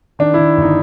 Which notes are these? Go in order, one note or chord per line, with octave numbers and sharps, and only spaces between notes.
D#3 D4
D#3 E4
G1 D#4